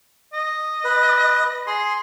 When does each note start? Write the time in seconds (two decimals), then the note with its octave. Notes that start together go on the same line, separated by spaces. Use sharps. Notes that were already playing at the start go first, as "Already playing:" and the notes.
0.33 D#5
0.84 B4
1.67 G#4 C6